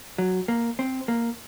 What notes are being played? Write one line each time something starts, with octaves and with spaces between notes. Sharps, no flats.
F#3
A#3
C4
A#3